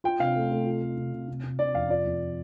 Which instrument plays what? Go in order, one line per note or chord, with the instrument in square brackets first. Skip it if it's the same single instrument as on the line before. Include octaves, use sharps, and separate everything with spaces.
[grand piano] F4 [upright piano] G5
[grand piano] C3 [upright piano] F5
[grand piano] A3
A3
F4
A3
C3
C3
C3
C3
[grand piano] C3 [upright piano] D5
[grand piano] F2 [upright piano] F5
[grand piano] F4 [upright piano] D5
[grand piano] F2